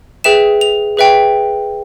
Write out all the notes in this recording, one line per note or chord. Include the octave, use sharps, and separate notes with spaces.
G#4 B4 E5 G5 E7
F7
G#4 B4 E5 G5